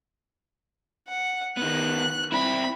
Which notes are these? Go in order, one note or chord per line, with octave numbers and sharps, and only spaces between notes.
F#5
D#3 B3 F#6
C4 E4 B5